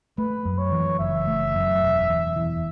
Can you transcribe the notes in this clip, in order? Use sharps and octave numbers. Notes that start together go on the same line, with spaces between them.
A3 B4
F#2
C#5
E3
F#1 E5
A3
F#2
E1
E2
E3